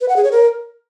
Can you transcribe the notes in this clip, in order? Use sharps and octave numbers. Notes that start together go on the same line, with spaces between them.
B4
F#5
G#4
C#5
A#4